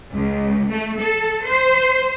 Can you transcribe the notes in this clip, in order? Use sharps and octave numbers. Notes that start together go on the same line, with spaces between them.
C#2
A3
A4
C5